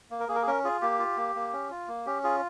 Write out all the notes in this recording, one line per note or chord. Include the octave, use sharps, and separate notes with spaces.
A#3
A#4
A#3 G#4
A#4
G#4
C#4 A#4
F4 G#4
A#3 G4
F4
A#3
A#3
C#4
F4
A#3
C#4 G4
F4 G#4